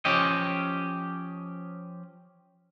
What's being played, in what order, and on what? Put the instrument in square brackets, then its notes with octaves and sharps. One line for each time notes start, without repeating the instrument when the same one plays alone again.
[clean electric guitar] F3 C#4 G4 D#5